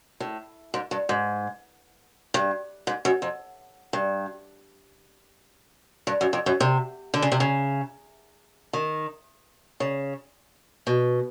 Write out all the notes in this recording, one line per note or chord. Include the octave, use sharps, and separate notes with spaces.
A2
G#2
G2
G#2
G2
G#2
F#2
F2
G2
G2
F#2
F2
F#2
C3
D3
C#3
C3
C#3
D#3
C#3
B2